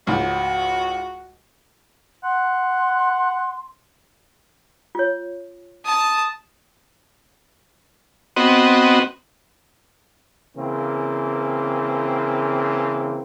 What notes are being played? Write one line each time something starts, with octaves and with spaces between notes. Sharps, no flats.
C#2 G#2 F#4
F#5 C6
F4 C#5
A5 D#6
B3 C4 F#4 D#5
C#3 E3 A#3 C4